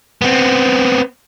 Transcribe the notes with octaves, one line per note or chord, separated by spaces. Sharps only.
B3 C4